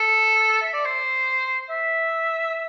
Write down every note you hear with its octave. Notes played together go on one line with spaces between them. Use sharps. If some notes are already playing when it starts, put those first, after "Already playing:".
Already playing: A4
E5
D5
C5
E5